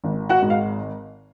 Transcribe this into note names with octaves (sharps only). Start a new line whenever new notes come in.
G#1
F#4 F#5
G#2
F5